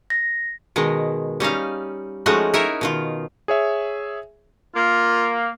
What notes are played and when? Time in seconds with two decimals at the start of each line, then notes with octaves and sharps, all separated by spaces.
0.10 A#6
0.76 B2 D#3 G#3
1.40 G3 C#4 D#4 F5
2.26 F3 G#3 A3 C#4 D#4 F#4
2.54 D#4 E4 A#4 C#5 E5
2.81 B2 D#3 F4
3.48 G#4 C#5 E5
4.75 A#3 F4